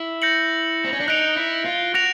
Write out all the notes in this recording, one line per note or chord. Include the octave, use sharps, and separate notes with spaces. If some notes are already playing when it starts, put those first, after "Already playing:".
Already playing: E4
G6 A#6 C#7 F#7
C4
C#4
D4
D#4 F#6 A#6 D7 F7
E4
F4
F#4 F#6 A#6 D7 F7